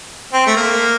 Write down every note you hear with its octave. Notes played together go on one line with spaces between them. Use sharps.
C4
A3
A#3